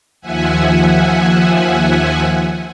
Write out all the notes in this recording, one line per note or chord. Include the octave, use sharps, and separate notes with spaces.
D#2 F3 E5 F#5 G#5